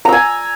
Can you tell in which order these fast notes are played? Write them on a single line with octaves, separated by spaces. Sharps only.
A#5 E6 G#5